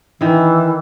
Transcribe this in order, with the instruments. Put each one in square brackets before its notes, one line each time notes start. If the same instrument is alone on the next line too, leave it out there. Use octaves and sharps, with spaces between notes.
[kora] D#3 E4 [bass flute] E3